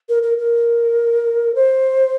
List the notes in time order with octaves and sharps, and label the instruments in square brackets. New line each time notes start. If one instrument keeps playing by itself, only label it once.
[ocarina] A#4
A#4
A#4
C5